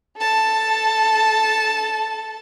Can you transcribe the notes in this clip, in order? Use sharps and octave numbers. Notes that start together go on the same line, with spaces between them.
A4 A5